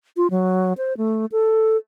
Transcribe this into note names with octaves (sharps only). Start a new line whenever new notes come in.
F4
F#3
C5
A3
A4